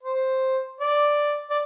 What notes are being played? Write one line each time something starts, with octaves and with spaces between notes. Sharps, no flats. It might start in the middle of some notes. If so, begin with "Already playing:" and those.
C5
D5
D5